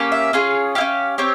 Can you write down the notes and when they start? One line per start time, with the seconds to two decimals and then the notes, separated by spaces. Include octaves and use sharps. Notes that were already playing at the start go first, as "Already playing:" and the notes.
Already playing: A#3 C#4 G4
0.12 E5
0.33 C#4 F4 G#4
0.75 E4 G4 F5
0.81 C#4
1.18 C4 G4 C#5